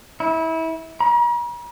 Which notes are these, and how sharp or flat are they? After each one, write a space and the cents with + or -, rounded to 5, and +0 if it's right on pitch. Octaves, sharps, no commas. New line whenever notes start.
E4 -25
A#5 +45